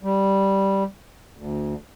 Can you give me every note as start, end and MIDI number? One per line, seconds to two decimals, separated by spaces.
0.03 0.84 55
1.37 1.74 38